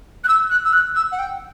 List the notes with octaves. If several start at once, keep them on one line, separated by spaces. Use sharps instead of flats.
F#6
E6
F#6
E6
F#6
E6
F#5
G5